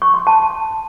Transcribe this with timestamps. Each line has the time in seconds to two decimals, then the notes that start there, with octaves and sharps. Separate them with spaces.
0.02 C#6
0.14 C6
0.27 A5